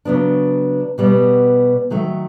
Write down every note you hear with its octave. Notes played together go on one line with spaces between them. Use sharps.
C#3 F#3 B3 D4
B2 G3 B3
D#3 F#3 A3